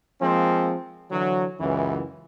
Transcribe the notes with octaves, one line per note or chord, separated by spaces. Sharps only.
F3 G#3 A#3 C4
D3 E3 F#3
C#2 F#2 E3